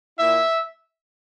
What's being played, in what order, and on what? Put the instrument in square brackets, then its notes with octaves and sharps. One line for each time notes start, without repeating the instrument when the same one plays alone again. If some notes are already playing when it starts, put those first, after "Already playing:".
[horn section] A#2 A#3 E4 E5